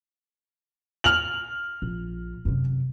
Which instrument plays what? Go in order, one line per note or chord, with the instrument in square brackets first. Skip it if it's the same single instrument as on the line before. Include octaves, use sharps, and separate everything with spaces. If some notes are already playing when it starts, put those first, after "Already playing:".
[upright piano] F6 F7 F#7
[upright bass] A#1
F#2 C3